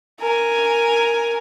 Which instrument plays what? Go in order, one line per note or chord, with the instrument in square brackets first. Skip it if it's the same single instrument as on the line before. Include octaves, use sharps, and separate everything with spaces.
[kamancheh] A#4 G#5